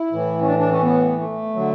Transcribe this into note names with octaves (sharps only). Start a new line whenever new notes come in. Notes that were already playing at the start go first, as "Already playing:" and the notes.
Already playing: E4
A2 E3
C#4
D4
D4
C#4
B3
A3
D3 F#3